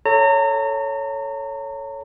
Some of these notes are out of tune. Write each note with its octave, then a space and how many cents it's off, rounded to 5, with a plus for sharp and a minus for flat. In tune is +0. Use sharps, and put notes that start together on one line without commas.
A4 +0 C#5 +0 A#5 -35